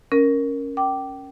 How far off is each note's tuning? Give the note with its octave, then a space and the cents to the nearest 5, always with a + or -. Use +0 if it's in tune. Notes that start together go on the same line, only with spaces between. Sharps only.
C#4 +0 A#4 +0
G5 -25 D6 +0